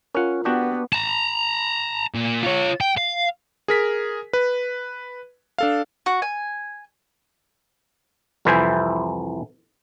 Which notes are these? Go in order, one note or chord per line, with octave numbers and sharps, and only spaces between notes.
C#4 F4 A#4 F#5
B3 D4 F#4 G4
A5 A#5
A#2
F4 C#5
G5
F5
G#4 A#4 B6
B4
D4 A4 F5
F#4
G#5
C2 F2 E3 E4 C5 G#5